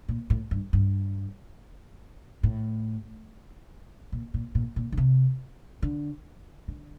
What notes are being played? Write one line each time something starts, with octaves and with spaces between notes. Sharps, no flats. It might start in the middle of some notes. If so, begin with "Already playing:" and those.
A#2
A2
G2
G2
A2
A#2
A#2
A#2
A#2
D3
C3
D3
D3